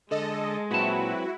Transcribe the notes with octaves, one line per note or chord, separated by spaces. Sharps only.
D3 G#3 A4 D#5
A#2 F#3 C4 E4 F#4 B4 A5